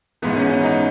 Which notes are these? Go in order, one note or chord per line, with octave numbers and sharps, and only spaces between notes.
G#1 G#2 E3 B3
C#4
C#4
D#4